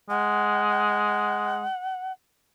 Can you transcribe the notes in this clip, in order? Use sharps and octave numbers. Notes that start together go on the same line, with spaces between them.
G#3 F#5